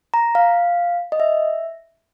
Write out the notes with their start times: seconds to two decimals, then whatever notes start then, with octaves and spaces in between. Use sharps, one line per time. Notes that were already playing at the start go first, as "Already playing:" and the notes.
0.14 A#5
0.35 F5
1.12 D#5
1.20 E5